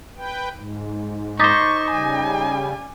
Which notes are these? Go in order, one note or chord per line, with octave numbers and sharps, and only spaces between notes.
B4 G5
G#2
D#4 C5 C#6 D6 A6 B6
C#3 G3 G#5